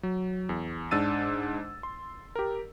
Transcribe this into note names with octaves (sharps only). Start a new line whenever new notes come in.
F#3
E2
G#2 D4 E6 A6 D#7
C6
G4 A#4